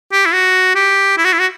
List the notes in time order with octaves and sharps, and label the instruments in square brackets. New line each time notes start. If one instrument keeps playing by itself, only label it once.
[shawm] G4
E4
F#4
G4
E4
F#4
E4
F#4